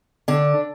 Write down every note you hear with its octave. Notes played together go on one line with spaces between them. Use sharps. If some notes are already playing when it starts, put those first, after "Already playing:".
D3 D4